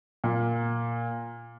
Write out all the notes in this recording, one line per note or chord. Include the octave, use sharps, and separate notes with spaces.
A#2